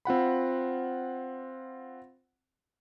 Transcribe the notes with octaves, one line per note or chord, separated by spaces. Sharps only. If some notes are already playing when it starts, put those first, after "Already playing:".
C4 F4 F#5 B5